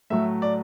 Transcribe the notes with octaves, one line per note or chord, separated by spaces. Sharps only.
A2 F#3 A3 E5
D5